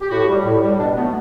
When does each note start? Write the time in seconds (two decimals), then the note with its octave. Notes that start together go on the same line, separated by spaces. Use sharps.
0.02 G4
0.11 A2 F#4
0.29 G3
0.45 A2
0.62 G3
0.79 B2 D4
0.96 F#3 A3 B3